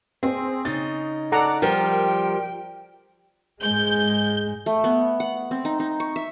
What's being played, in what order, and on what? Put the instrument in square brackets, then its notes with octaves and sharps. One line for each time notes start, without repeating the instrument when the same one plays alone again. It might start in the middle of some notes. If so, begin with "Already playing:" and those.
[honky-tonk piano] C4 C5 [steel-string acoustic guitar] G#4
[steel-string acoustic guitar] C#3 D#4 [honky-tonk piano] A6
[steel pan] A4 F#5 A#5 [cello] D5
[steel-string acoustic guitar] F3 G3 [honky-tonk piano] A#4 [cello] G5
[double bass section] G#2 G#3 [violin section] G6
[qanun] A3
B3
F#5
C4
D#4
D#4
C#6
E5